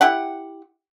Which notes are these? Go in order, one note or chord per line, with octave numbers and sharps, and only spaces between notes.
E4 G4 F#5